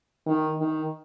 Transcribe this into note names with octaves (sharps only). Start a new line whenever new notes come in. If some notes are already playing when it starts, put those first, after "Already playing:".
D#3
D#3